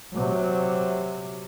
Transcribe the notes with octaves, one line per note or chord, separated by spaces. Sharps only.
C3 F#3